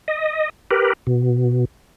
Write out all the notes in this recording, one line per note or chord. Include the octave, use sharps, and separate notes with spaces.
D#5
G4 A#4 B4
B2